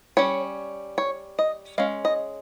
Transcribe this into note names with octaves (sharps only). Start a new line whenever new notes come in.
G3 C#4 C#5
C#5
D#5
G#3 C#4 F5
D#5